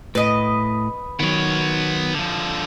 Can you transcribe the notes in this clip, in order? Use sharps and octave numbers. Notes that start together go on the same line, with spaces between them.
A2 B4 D#5
D#3 F#3 B3 C#5
D3 F3